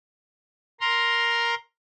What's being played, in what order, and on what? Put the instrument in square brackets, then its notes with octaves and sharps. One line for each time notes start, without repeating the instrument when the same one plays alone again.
[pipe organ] A#4 A#5 C6